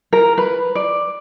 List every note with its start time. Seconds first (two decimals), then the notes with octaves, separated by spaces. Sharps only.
0.13 A#4
0.38 B4
0.75 D5